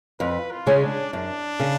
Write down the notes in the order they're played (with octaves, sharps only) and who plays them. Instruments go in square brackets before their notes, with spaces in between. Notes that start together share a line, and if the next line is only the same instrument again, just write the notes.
[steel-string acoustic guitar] F2 [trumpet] B4
[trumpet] F4
[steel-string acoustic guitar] C#3 G#3 C#4
[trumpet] D4
[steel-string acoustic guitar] F#2 [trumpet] D4
[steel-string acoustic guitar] C#3